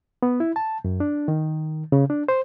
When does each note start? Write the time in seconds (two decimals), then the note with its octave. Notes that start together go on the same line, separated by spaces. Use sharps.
0.23 B3
0.40 E4
0.56 A5
0.85 F#2
1.00 D4
1.28 D#3
1.92 C#3
2.10 D4
2.28 C5